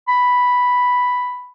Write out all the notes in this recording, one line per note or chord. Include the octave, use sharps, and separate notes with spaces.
B5